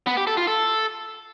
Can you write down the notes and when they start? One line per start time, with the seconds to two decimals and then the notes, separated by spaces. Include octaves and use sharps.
0.07 B3
0.17 G4
0.27 A4
0.37 F4
0.47 A4